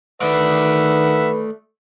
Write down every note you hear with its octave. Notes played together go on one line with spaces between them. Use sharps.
D#3 A3 B4 D5 E5 F#5